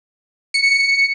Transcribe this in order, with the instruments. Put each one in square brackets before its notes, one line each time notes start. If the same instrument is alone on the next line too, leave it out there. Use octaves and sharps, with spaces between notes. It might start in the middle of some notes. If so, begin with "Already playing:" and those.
[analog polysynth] C#7